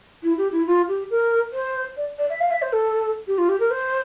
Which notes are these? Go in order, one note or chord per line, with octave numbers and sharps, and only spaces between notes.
E4
G4
E4
F4
G4
A#4
C5
D5
D5
E5
F5
E5
C5
A4
G4
F4
G4
A#4
C5